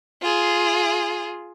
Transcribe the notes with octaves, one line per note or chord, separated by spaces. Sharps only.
F4 G#4